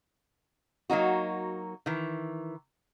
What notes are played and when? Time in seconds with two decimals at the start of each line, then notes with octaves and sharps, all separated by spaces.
0.90 F#3 A#3 D#4 F#4
1.86 D#3 E3